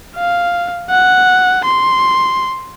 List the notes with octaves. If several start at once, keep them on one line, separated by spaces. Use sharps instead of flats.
F5
F#5
C6